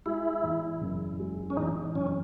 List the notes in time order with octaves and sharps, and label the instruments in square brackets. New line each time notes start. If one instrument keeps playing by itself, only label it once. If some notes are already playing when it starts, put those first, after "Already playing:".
[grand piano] G#3 [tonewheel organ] E4
[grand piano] E2
F#1
G#3
[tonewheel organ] C#4
[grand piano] E2 [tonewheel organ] D#4
[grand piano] F#1 [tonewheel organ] C#4